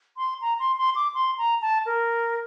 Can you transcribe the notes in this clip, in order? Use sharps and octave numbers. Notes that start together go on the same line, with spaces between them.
C6
A#5
C6
C6
D6
C6
A#5
A5
A#4